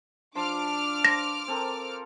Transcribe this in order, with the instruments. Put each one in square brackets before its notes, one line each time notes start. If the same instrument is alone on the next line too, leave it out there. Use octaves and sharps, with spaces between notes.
[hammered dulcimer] F3 C6 [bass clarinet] D4 [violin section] D6 F6
[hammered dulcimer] C5 [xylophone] A#6
[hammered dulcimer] C4 A4 A#4